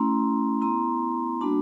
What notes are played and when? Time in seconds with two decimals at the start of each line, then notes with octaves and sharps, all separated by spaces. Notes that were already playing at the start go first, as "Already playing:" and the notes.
Already playing: A3 C#4 E4 A#5 C6
0.61 B3 E4 A#5 C6
1.41 G3 A#3 D4 F#4 A5 B5